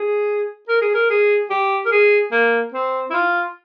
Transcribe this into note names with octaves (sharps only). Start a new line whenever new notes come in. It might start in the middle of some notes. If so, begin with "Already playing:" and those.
Already playing: G#4
A#4
G#4
A#4
G#4
G4
A#4
G#4
A#3
C4
E4
F4